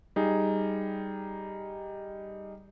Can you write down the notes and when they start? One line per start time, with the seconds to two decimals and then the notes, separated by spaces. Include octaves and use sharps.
0.16 G3 D#4 G#4